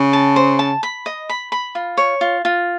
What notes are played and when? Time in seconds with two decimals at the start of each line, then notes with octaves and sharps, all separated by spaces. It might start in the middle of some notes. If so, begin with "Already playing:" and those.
Already playing: C#3
0.13 A5
0.36 C5
0.59 A5
0.83 B5
1.06 D#5
1.29 B5
1.52 B5
1.75 F4
1.97 C#5
2.21 F4
2.45 F4